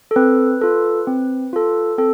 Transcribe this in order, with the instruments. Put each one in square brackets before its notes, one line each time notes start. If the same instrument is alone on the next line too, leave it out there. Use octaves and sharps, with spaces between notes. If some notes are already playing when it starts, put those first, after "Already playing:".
[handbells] A4
C4 B4
F4 A4
C4
F4 A4
C4 A4